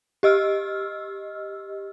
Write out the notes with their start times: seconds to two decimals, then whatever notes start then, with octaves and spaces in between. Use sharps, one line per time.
0.23 G4 D#5 E6 F6